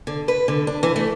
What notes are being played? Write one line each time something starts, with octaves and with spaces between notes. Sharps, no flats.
D3
B4
D3
D4
E3
A3